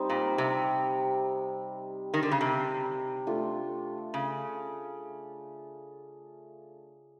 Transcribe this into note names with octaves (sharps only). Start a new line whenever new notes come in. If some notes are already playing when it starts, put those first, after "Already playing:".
Already playing: G3 C4 D#4
A#2
C3
D#3
D3
C#3
C3
A3 D4 F4
C#3